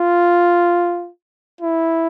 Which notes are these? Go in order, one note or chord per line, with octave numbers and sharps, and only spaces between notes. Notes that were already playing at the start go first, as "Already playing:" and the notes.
Already playing: F4
E4